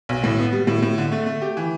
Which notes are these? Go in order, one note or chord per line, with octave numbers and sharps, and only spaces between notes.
B1
A2
B3
G3
A2
A2
D3
A3
A3
G4
E3